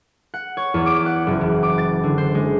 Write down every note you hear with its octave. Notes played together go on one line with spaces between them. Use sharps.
F#5
C#5
E2
D6
F#5
F#1
E3
D6
A6
D3
C5
G#3